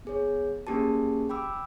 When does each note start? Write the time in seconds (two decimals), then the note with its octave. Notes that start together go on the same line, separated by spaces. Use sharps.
0.05 B3 G#4 C#5
0.67 A#3 C#4 G4 G#4 A5
1.29 G5 B5 D6 E6